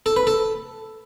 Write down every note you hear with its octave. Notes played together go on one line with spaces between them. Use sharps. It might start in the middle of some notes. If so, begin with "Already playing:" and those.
A4
B4
A4